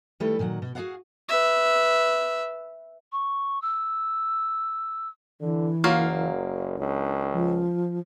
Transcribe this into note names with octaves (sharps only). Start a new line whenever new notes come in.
D#3 G3 A3 E4 A4 B4
A#2 D#3 F#3 F#5
B2
F#4 G#4 A4 D5 F5 F#5
B4 E5
C#6
E6
D3 E3
F#1 F#3 A#3 F4
C#2 D4
F3